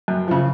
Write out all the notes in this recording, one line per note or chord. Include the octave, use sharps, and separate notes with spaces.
F#2
C#3 F3